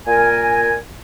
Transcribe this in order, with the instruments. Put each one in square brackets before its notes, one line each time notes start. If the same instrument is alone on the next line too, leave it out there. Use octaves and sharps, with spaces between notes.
[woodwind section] A#2 A#4 G#5